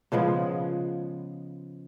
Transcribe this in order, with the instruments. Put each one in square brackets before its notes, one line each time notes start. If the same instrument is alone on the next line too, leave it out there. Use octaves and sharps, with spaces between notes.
[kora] C#3 F3 G#3 B3